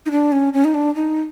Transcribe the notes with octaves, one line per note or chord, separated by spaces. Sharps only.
D#4
D4
C#4
C#4
D#4
D4
D#4